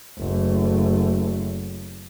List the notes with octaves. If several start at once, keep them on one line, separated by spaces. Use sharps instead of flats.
F#1 A3